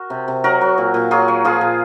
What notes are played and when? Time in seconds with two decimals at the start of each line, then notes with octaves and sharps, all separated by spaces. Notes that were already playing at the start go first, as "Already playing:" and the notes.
Already playing: F#4 A#4
0.10 C3
0.28 C3
0.44 F#3 F#4 A#4
0.61 F#3
0.78 A#2
0.94 A#2
1.11 F#3 F4 G#4
1.28 F#3
1.45 F3 F4 G#4
1.61 A#2